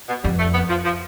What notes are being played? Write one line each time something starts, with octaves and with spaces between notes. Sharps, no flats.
B2
F2 G3
A3
B3
F3
F3